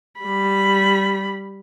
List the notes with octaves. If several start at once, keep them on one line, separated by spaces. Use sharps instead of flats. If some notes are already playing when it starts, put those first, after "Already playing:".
G3 B5